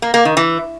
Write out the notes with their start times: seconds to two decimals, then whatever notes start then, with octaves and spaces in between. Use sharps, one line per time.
0.02 A#3
0.14 A#3
0.25 D#3
0.37 E3